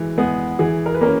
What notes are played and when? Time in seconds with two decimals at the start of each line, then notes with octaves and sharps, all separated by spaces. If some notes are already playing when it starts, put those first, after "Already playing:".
Already playing: E3 G#3
0.18 G#3 B3 G#4
0.59 E3 G#4
0.86 A#4
0.94 B4
1.01 A#3 C#4 A#4